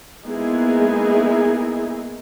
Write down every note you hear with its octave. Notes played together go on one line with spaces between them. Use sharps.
G#3 A#3 B3 D#4 E4 G#4